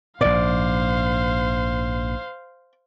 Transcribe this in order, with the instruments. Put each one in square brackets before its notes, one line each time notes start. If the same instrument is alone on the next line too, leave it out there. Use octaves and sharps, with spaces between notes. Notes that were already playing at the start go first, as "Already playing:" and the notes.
[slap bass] A#1 G#2 [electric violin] C5 F5 [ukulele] D5